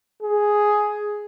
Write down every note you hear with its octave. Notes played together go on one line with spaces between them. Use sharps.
G#4